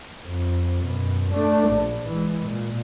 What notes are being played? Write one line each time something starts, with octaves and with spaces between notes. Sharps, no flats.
F2
F#2 B2
A3 D4
A#1
E3 G#3
A#2